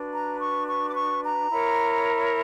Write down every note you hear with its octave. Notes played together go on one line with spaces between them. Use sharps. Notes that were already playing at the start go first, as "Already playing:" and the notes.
Already playing: D4 F#4 B4
A#5
C#6
C#6
D6
C#6
A#5
E4 A#4 C#5